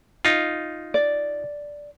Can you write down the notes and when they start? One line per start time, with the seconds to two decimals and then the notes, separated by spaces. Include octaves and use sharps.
0.25 D#4 F4
0.94 D5